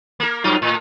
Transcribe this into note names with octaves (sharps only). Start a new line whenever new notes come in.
A#3 A#4
G2 F#3 F4
A2